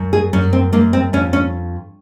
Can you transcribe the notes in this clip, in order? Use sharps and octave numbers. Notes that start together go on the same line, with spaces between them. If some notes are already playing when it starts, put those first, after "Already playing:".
Already playing: F#2
G#4
F#2 C#4
C4
F#2 A#3
C4
F2 C#4
C#4